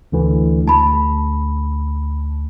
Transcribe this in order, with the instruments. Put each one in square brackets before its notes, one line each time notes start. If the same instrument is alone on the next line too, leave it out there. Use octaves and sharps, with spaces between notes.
[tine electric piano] D2 D3 E3
[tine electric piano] D2 [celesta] A5 B5